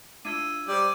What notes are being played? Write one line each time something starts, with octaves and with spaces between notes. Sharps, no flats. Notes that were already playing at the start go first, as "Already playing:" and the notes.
D4 E4 F4 E6 G#6 D#7
G3 G4 C5 D5